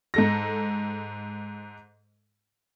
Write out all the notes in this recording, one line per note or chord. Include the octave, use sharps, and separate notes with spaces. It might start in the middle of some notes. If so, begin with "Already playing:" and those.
G#2 A4 A#6